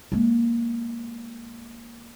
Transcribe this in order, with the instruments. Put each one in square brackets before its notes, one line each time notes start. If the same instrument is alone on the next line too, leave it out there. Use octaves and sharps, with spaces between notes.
[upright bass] G#3 A#3